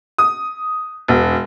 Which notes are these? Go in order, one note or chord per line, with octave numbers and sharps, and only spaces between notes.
D#6
E1